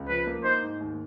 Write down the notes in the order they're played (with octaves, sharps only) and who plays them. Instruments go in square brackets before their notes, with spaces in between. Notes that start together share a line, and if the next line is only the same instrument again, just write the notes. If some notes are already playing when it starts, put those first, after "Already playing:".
Already playing: [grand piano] C#2
[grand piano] F3 [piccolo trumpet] B4
[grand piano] A#3
[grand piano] D#4 [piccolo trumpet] C5
[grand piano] G#2
D#2